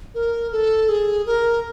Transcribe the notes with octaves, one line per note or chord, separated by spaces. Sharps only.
A#4
A4
G#4
A#4